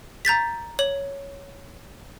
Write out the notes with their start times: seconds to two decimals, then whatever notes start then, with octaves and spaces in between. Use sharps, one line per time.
0.25 A#5 G6 A6 B6
0.79 C#5 F#7